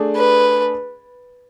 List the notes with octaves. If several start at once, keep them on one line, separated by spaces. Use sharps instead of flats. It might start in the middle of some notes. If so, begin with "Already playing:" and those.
Already playing: A3 D4 G#4 D5
B4